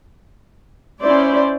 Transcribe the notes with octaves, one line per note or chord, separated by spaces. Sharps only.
C#4 E4 C5 D5